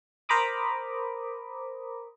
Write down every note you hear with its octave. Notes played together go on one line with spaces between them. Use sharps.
A#4 C5 A#5 B5 D6 D#6